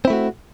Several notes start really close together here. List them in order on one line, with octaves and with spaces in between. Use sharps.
C4 E4 A3 F#4